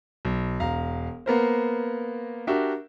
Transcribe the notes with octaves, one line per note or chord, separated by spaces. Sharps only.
B1
E1 F5 A#5
A#3 B3 A#4 C5
D4 F#4 G4 A#4 E5